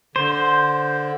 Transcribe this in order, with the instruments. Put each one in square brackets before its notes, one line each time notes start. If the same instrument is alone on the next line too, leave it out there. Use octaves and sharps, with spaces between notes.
[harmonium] D3 [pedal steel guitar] C5